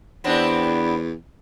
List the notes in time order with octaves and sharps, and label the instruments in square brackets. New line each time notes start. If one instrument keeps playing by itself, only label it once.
[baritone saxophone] E2 [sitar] B3 C4 D4